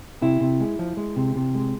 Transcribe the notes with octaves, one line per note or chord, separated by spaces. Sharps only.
C3 E4
C3
G#3
F3
G#3
C3
C3
G#3